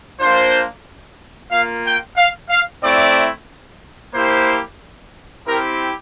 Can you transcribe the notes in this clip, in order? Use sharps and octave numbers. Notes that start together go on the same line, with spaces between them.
A#3 D4 F4 C5
A#3 F4 F5
G5
F5
F5
A3 C4 E4 D5
A#3 E4 G4 C5
C4 E4 G4 A#4